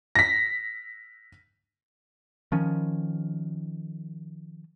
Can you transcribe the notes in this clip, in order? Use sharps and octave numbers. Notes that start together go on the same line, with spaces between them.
A#6 B6
D#3 F3 C#4